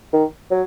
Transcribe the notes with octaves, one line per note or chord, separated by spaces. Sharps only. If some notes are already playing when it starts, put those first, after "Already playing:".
D#3
F#3